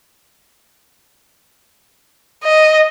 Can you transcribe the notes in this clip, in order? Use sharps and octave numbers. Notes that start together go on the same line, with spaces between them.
D#5